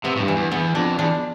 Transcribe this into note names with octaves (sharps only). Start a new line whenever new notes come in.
C3 B3
A2
G2
E3
E2
E2 B3
F2 D4
E2 D4